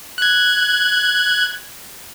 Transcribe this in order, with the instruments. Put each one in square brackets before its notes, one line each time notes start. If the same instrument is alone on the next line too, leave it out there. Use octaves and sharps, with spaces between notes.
[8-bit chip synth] F#6 G#6